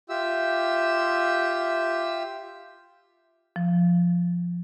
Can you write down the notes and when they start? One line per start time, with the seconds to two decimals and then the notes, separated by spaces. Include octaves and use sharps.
0.09 F4 G4 E5 E6
3.56 F3